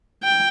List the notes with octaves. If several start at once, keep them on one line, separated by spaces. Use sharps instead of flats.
G5